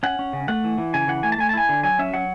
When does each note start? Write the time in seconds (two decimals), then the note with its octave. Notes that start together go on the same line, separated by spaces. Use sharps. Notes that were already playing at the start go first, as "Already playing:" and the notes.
0.03 C#4 F#5
0.19 C#4
0.33 C#3
0.48 A3 F#5
0.64 E3
0.78 E3
0.94 C#3 G#5
1.08 E3 F#5
1.23 A3 G#5
1.32 A5
1.38 A3 G#5
1.49 A5
1.54 E4 G#5
1.69 D3
1.83 F#3 G#5
1.99 C#4 E5
2.14 F#3 F#5